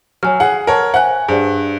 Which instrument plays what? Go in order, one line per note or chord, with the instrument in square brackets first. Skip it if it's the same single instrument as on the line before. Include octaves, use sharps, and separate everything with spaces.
[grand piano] F#3 [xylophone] C#5 G#5 F6
[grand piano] G#4 F#5
[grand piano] A#4 C#5 [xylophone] A5
[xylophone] C5 E5 G#5 [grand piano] F#5 F#6
[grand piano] G2 [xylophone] G#4 C5 D5